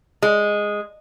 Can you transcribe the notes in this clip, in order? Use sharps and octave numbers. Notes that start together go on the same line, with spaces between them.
G#3